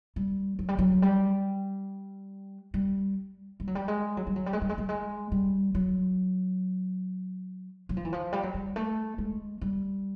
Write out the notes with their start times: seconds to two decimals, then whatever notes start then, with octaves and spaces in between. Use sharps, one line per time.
0.16 G3
0.59 F#3
0.68 G3
0.79 F#3
1.02 G3
2.74 G3
3.60 G3
3.67 F#3
3.75 G3
3.88 G#3
4.17 F#3
4.27 G3
4.36 F#3
4.46 G3
4.53 G#3
4.62 G3
4.69 G#3
4.78 G3
4.89 G#3
5.32 G3
5.75 F#3
7.89 F#3
7.97 F3
8.05 E3
8.13 F3
8.33 G3
8.43 F#3
8.54 G3
8.76 A3
9.18 G#3
9.61 G3